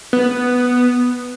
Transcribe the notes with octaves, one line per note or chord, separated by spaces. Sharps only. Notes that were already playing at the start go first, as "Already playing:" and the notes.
B3